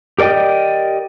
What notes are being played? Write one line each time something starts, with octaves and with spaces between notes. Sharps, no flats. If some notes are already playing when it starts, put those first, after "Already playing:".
G4 A#4 D5 D#5 G5